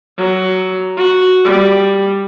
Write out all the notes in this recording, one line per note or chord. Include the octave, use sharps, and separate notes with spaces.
F#3
F#4
G3